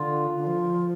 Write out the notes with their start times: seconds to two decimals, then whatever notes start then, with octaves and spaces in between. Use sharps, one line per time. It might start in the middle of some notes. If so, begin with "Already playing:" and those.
Already playing: D3 F4
0.36 D3
0.47 F3